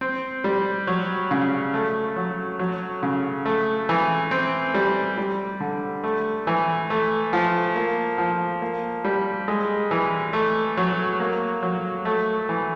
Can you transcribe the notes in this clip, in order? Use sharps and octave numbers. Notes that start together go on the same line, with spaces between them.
C4
G3
F#3
C#3
A3
F#3
F#3
C#3
A3
E3
C4
G3
G3
D3
A3
E3
A3
F3
A#3
F3
A#3
G3
G#3
E3
A3
F#3
A#3
F#3
A3
E3